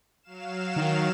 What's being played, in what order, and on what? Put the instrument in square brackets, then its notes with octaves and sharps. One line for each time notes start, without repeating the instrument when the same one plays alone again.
[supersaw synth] F#3 F5 E7
[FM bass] D#3